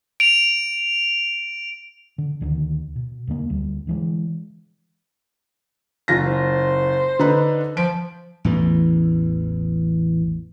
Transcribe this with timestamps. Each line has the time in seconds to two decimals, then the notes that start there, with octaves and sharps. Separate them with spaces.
0.20 D7 F7
2.18 D3
2.41 D2 D3 D#3
2.96 B2
3.27 E2 D3 G#3 A#3
3.50 D2 G3
3.87 D3 E3 G#3
6.08 F#1 F4 A#6
6.26 C5
7.19 D3 D#4 B4
7.77 F3 D7
8.45 A1 E2 E3